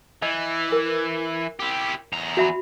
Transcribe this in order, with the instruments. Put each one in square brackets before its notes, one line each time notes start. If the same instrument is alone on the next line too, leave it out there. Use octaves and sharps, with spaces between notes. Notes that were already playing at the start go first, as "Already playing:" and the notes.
[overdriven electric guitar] E3 [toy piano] D#5
[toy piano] A#4
[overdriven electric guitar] E4 G4
E2 A#5
[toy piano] F#4 E5 B5